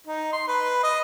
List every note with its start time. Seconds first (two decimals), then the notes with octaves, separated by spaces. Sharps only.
0.07 D#4
0.33 C6
0.48 B4
0.83 D#5